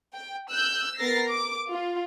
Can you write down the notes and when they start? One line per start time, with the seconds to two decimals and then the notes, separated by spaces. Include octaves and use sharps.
0.13 G5
0.49 E6 F#6 G6
0.98 B3 A#4 A6 A#6 C7
1.29 D6
1.70 F4